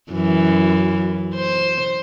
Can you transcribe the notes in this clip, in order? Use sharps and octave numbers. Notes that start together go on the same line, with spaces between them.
F#2 E3
C5